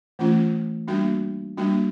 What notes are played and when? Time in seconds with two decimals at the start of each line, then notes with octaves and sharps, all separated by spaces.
0.19 E3 A3 C#4 F4
0.88 G3 A#3 D4 F#4
1.57 G3 A#3 D4 F#4